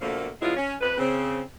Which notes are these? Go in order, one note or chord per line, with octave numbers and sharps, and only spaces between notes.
B2 D3 F3 A3 A#3
C#3 F#3 G#3 B3 E4 F4
C#4
F2 B4
C#3 C4